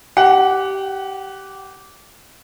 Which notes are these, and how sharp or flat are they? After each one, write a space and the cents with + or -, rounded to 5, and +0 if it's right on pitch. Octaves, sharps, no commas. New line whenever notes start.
G4 -15 F#5 +10